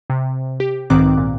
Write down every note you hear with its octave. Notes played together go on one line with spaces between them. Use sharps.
C3
G4
B1 G#2 D#3 C4 D6 F#6
A#2